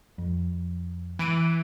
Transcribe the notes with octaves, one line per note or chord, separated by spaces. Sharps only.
F2
E3 D7 D#7